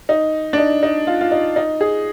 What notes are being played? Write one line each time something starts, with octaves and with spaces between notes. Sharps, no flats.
D#4
D4
D#4
D#4
F4
F4
D#4
D#4
G#4